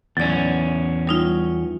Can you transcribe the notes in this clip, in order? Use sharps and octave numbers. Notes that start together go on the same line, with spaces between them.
E2 F#3 C#4 D5
G3 D#4 F4